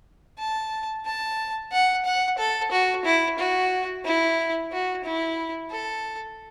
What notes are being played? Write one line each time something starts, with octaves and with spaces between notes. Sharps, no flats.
A5
A5
F#5
F#5
A4
F#4
E4
F#4
E4
F#4
E4
A4